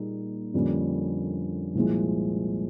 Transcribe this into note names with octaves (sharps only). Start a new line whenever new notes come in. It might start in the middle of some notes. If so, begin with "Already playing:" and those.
Already playing: A#2 G3 A#3 D#4 G#4
F2 D3 G3 A#3 C#4
C2 A#2 F3 G#3